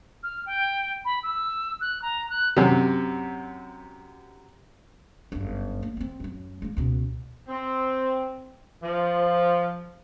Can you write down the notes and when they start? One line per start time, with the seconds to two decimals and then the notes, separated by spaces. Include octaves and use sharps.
0.23 F6
0.46 G5
1.05 B5
1.23 E6
1.81 F#6
2.02 A#5
2.30 F#6
2.57 F#2 C3
5.32 G1 F#2
5.82 A#3
5.97 B3 C4
6.20 F#2 F#3
6.62 G#3 A#3
6.77 C#2 B2
7.48 C4
8.83 F3